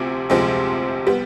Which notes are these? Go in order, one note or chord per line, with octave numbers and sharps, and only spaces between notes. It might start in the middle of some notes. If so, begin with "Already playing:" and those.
Already playing: D2 C3 F3 C4
D2 C3 F3 G#3 C4
G3 B3